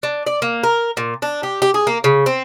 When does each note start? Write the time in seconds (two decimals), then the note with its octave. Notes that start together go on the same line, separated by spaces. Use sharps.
0.03 D4
0.27 D5
0.42 A#3
0.63 A#4
0.97 A#2
1.22 D4
1.43 G4
1.62 G4
1.74 G#4
1.87 A#3
2.04 C#3
2.26 C4